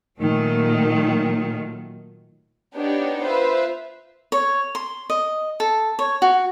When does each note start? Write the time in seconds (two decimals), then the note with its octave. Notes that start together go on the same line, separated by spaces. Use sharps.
0.18 A#2 D#3 F#3 A3
2.75 B3 D4 D#4 G4 C#5
3.26 F4 B4 C5 E5
4.32 C#5
4.75 C6
5.10 D#5
5.60 A4
5.99 C#5
6.22 F#4